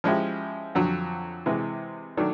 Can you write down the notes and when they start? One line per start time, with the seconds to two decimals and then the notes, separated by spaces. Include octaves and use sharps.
0.04 F3 G#3 C#4 E4 G4
0.75 F2 D3 F#3
1.46 C3 E3 G#3
2.17 D#3 F#3 A3 D4